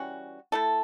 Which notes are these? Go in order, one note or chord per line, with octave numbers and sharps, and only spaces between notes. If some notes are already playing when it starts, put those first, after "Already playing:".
Already playing: E3 G3 C#4 F#4
A3 E4 A4